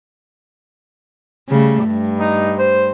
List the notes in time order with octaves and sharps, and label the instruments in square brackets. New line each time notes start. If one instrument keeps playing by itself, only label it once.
[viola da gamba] C#3 G3 A3
G2
[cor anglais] D#4
C5